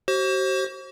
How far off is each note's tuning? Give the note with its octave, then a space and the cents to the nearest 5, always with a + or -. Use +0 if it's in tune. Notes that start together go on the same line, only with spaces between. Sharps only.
F#4 +45 C5 +30